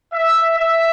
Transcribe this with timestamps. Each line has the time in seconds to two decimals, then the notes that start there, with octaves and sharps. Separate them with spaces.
0.12 E5
0.58 E5